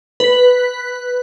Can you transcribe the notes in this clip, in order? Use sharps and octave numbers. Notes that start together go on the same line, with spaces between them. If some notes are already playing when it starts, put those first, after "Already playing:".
B4 B6